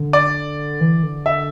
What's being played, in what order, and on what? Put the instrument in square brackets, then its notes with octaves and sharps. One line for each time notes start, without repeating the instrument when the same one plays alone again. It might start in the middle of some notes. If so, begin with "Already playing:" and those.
Already playing: [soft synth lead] D3
[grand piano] D5
[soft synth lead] E3
D3
[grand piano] E5